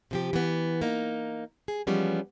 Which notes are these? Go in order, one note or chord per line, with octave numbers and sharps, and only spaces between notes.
C3 F3 G4
E3 B3
A#3 D#4
G#4
E3 F3 G3 G#3 B3 C#4